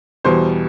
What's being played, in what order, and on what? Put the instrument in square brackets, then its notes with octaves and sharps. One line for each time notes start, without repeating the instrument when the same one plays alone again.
[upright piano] E2 B2 G3 C5